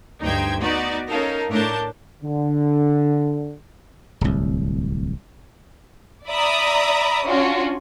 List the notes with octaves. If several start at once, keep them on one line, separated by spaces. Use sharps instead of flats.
D2 G2 D#4 C5 G5 G#6
B3 D#4 F#4 D5
C#4 D#4 A4 A#4 F5
A2 D4 A#4 C#5 A5 G6
D3
D1 C2
D5 E5 A#5 B5 D#6
C#4 D4 F4 F#4